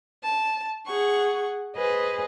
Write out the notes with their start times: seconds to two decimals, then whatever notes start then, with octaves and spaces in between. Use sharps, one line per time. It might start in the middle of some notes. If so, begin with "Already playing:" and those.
0.23 A5
0.86 G#4 F#5 C#6
1.75 G#4 B4 C5 D#5